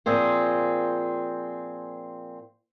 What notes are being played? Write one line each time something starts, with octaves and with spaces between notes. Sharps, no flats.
A#2 F3 C4 G#4